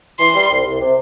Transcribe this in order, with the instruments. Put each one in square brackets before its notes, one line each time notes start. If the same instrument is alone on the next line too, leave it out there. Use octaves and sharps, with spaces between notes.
[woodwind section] E3 [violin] C6
[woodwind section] G3
C2
C2
C3